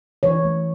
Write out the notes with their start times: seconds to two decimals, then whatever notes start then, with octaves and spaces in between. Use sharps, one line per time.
0.23 E3 C#5
0.44 A3